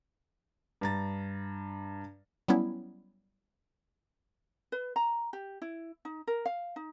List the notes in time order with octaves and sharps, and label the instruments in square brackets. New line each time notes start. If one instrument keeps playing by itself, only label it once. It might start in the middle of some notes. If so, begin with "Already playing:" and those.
[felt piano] G2 A#5 A6
[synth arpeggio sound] F#3 G3 B3 C#4 E4
[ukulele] B4
A#5
G4
E4
D#4
A#4
F5
D#4